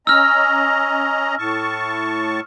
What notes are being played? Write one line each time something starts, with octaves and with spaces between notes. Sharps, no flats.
C#4 D#5 A#5 E6 F6
A2 A5 C#6